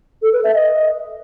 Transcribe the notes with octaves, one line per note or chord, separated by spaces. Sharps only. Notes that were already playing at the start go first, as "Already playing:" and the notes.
A4
B4
E5
D#5